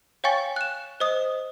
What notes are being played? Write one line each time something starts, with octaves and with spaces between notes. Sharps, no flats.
C#5 F5 G5 G#5 C#6 A6
F#6 E7
C5 D#5 D#6